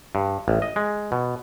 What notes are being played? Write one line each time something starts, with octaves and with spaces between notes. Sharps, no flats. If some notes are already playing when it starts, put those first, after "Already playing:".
G2
A1
D#5
G#3
B2